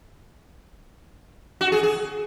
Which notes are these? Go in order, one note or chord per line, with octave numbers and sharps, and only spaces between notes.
F#4
G#4
G#4